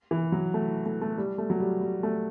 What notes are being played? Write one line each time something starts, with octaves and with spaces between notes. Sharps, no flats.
E3
F#3
A3
A3
A3
G3
A3
F#3
G3
G3
A3